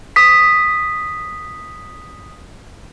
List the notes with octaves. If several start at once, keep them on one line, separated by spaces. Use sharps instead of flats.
D#6 B6